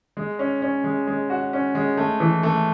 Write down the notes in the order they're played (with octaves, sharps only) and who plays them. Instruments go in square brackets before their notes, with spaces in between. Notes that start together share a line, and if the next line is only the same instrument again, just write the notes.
[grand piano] G#3
C#4
C#4
G#3
G#3
F#4
C#4
G#3
A3
E3
A3